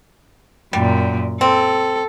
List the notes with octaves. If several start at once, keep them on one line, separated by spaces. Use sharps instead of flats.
F#2 A#2 G3
C4 A4